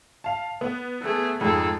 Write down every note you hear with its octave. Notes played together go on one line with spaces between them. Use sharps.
F5 A5
B3
A3 G#4
F2 G#2 G#4 A4